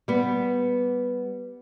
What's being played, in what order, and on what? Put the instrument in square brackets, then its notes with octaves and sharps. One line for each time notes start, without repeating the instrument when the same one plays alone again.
[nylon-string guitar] G3 B3